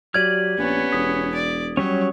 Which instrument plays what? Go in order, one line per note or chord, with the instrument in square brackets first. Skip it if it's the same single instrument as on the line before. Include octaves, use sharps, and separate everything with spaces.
[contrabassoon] F#3 [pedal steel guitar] G4 D5 F6 [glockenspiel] G#6 D#7 F#7
[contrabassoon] A#1 [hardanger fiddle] B3 C#4
[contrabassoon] E1 [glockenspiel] D#6 B6
[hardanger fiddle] D5
[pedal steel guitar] F#3 G3 C#4 [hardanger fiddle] C#5